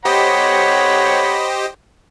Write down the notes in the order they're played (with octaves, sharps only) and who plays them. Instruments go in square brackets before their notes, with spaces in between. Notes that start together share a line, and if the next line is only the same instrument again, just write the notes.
[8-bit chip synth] G4 C5 D#5 [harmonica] C#5 F#5 B5